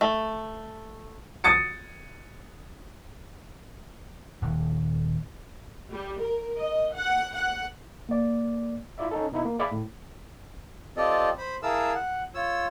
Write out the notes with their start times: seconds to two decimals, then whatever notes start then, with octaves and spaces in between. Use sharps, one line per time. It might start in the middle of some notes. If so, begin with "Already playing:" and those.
0.01 A3
1.44 D#6 A6 C#7
4.42 D#1
5.89 G3
6.21 A#4
6.58 D#5
6.94 F#5
7.35 F#5
8.09 A#3 D5
8.98 E4 F4 D5 E5
9.11 C#4 D#4 A4
9.32 B2 D#4 E4
9.45 A#3
9.59 G#4 D5 E5 F5 G#5 B5
9.71 A2
10.97 C4 F4 G4 A4 D5 D#5
11.38 C5 B5
11.63 E4 G#4 A#4 F5 A5 E6
11.95 F#5
12.35 F4 C#5 E6